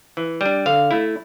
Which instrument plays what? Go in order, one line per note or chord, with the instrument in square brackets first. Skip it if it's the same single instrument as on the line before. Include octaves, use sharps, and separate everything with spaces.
[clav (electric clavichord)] E3
G3 D4
D3 F5
A3 E4